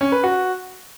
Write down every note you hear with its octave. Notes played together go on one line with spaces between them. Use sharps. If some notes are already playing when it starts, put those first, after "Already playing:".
C#4
B4
F#4